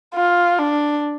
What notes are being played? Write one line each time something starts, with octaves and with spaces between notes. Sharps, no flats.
F4
D4